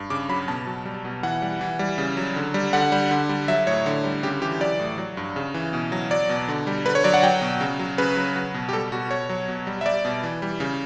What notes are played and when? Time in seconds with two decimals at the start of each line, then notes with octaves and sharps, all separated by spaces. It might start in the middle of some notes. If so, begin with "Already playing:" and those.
Already playing: G2
0.10 C#3 D6
0.29 F#3 B5
0.48 B2 A5
0.67 F#3
0.85 G3
1.05 B2
1.23 E3 F#5
1.42 G3
1.61 E3
1.79 G3
1.98 C#3
2.17 F#3
2.36 D3
2.54 G3
2.73 D3 F#5
2.92 G3
3.11 D3
3.29 G3
3.48 F#3 E5
3.67 A2 C#5
3.86 D3
4.04 G3
4.23 C#3 G4
4.42 E3 G4
4.60 F#3 D5
4.79 A2
4.98 F#3
5.17 G2
5.36 C#3
5.54 E3
5.73 B2
5.92 F#3
6.11 F#3 D5
6.29 B2
6.48 D3
6.67 G3
6.86 D3 B4
6.95 C#5
7.04 F#3 D5
7.14 F#5
7.23 F#3 G5
7.42 B2
7.61 C#3
7.79 F#3
7.98 C#3 B4
8.17 F#3
8.36 F#3
8.54 B2
8.69 G4
8.73 G3 A4
8.92 B2 F#4
9.11 B2 C#5
9.29 F#3
9.48 B2
9.67 G3
9.81 E5
9.86 G3 D5
10.05 B2
10.23 E3
10.42 G3
10.60 C#3